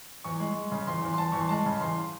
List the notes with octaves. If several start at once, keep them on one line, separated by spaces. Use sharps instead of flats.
E2 C#6
G#3
G#3
C#3
E2 C6
E2
C6
E2 A5
E2 C#6
C6
G#3 A5
C#3
E2 C6